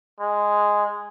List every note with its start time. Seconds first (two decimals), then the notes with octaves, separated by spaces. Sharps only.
0.20 G#3